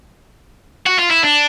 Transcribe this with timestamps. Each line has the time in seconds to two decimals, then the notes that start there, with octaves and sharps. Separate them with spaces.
0.86 F#4
0.99 F4
1.11 E4
1.23 D4